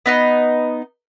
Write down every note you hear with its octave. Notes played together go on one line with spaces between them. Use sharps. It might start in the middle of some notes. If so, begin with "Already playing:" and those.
B3 D#4 D#5